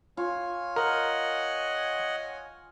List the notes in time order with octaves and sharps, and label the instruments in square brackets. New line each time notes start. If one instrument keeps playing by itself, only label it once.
[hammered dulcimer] F4 [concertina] C#5 G#5
[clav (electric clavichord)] A#4 [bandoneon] D#5 F#5